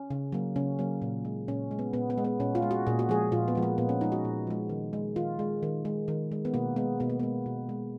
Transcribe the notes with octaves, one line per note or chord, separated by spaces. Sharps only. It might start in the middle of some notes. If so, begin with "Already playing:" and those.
Already playing: C#4
C#3
F#3 A#3
C#3 C#4
F#3 A#3
A#2
G#3
A#2 C#4
G#3
B3
A#2 B3
B3
G#3
B3
A#2 C#4
F4
G#3
F#4
A#2 G#4
F#4
F3 G#3 G#4
A#2 F4
B3
F3 G#3
A#3
A#2 B3
C#4
F3 G#3 D#4
F#4
A#2
F3 G#3
D#3
G#3
D#3 F4
G#3
D#3
G#3
D#3
G#3
B3
B2 A#3
G#3 B3
B2 B3
A#3
G#3 B3
B2
G#3